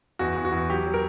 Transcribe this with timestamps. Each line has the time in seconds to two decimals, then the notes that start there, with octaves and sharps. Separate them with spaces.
0.19 E2 F#4
0.36 E2
0.45 F#4
0.52 E2
0.69 F#3 G4
0.86 F#3
0.94 A#4